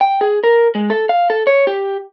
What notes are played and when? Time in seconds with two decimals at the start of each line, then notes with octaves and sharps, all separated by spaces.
0.01 G5
0.21 G#4
0.44 A#4
0.75 G#3
0.90 A4
1.09 F5
1.30 A4
1.47 C#5
1.67 G4